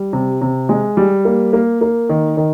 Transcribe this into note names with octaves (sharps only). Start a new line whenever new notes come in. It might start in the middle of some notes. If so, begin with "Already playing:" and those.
Already playing: G3
C3
C3
G#3
G3
A#3
A#3
A#3
D#3
D#3